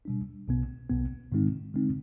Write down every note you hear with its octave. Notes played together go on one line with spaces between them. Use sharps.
B2 G3 D4
B1 B2 B3
B1 B2 B3
G#2 D#3 G#3 C4 D#4
D3 G#3 C4 D#4